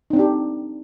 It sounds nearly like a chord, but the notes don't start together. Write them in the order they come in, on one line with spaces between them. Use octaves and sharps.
D#4 C4 D4 G4